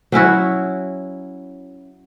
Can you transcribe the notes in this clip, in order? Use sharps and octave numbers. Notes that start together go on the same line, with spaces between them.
F#3 C#4 E4 F#4